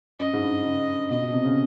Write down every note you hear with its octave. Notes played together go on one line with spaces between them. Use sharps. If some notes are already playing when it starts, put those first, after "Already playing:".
F#2 D#5
G#2
G2
C#3
B2 D#5
B2
C3
C#3